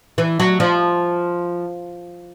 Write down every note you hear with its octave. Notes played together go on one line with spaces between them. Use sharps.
E3
F#3
F3